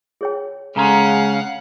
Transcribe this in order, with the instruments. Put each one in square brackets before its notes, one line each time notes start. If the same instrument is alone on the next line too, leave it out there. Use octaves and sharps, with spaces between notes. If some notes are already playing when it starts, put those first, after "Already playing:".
[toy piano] G#4 C#5 G5
[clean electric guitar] C#3 C#4 [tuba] G#3 [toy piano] A4 A#5 C6 [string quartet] F5 F#5